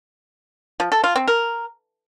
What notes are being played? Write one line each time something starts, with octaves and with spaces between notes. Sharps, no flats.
F3
A4
F4
C4
A#4